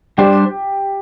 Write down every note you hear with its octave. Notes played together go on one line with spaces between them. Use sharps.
G3 D4 G4 C5